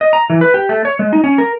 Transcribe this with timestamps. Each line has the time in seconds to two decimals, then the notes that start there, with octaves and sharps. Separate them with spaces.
0.01 D#5
0.13 A#5
0.30 E3
0.41 B4
0.54 G4
0.69 A3
0.85 C#5
0.99 G#3
1.13 D#4
1.24 C#4
1.38 A#4